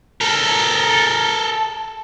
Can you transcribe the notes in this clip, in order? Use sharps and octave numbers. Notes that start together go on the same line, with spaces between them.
A4 A#4